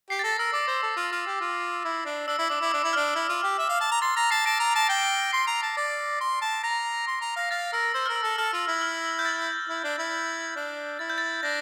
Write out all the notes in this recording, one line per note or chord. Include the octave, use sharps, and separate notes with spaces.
G4 C7
A6
A4 A#6
A#4 E6
D5 D6
C5
A4
F4
F4
G4
F4
E4
D4
D4 E6
E4
D4 D6
E4 D6
D4 E6
E4
D4 F6
E4
F4
G4
E5
F5
A5
A#5
C6 A6
A#5 A#6
A5 C7
A5 A#6 D7
A#5
A5
G5
C6 C7
A#5
A5
D5
C6
A5
A#5 A#6
C6
A#5
F5 A#6
F5 A6
A#4 E6
C5 E6
A#4 F6
E6
A4
A4 F6
F4
E4
F6
G6
A6
E4
D4
E4
D4
E4 A6
G6
A6
D4 A#6